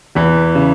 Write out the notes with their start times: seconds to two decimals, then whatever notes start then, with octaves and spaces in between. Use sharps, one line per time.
0.15 E2 E3
0.55 C#3